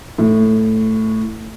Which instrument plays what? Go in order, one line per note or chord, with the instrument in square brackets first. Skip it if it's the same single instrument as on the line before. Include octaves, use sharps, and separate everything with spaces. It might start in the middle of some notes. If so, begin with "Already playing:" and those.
[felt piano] A2